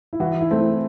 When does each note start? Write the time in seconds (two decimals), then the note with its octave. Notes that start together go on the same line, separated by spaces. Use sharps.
0.13 E4
0.20 E3 F#4
0.41 E4
0.51 A3 C4
0.61 E4